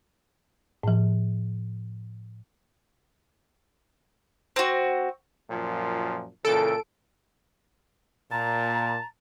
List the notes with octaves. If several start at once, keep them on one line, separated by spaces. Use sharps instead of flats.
A2 F3
C4 F#4
F#2 A#2 F3
A#2 C#3 E3 A4 D7
A#2 A5 A#5